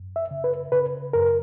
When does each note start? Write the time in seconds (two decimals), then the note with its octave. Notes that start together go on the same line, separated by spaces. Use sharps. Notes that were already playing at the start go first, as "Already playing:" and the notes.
Already playing: F#2
0.16 E5
0.31 C#3
0.44 B4
0.72 C#3 B4
1.13 F#2 A#4